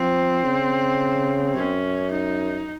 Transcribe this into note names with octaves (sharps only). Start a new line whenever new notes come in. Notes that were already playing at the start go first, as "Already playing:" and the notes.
Already playing: F3 C4
C#3
F#2 C#4
D#4